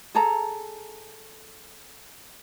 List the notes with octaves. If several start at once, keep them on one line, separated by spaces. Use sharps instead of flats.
G#4 A4 A#5